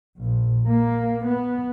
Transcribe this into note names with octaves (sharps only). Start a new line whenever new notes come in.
A#1
A#3
B3